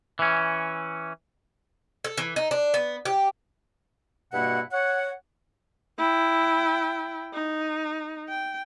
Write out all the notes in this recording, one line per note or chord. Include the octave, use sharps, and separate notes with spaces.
E3 C#4
A4
E3
D#4
D4
B3
G4
G2 B2 A#3 E4 F#5
C#5 F#5
E4 G5
D#4
G5